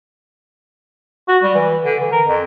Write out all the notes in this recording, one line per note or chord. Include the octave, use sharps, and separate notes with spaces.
F#4
G3
E3
D3
E3
A#4
F2